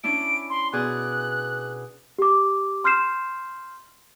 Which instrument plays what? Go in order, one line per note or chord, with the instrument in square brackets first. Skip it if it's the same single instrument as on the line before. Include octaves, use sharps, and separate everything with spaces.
[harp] C#4 D4 E4 [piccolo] D7
[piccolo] C6
[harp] B2 G#4 D5 [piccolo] F#6
[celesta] G4 D6
C6 F6 G6 C7 E7